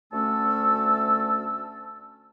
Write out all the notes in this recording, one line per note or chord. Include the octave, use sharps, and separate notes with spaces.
D2 A3 C#4 A5 E6